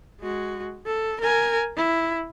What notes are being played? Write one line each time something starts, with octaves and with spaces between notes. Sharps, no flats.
G#3 F#4
A4
A#4 G#5
E4